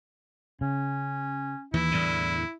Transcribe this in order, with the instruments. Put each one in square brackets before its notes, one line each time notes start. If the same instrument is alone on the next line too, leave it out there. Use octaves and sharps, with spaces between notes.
[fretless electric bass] C#3 [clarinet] C#4
[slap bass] D#2 [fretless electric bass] E3 [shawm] E4
[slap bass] E2 A2 D3 [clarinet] G3